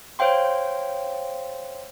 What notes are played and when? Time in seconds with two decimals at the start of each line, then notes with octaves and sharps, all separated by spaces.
0.19 C5 C#5 F5 G5 C6